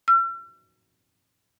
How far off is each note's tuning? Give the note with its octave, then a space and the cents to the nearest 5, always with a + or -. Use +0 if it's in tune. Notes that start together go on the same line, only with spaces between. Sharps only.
E6 +45